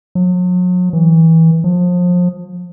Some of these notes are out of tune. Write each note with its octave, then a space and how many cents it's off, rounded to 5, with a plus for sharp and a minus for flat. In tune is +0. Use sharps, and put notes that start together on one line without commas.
F#3 -40
E3 -20
F3 +30